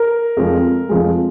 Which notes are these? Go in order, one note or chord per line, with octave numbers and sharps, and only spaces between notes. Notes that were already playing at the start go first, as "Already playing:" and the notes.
Already playing: A#4
F2 F3 G#3
F2 F3 G#3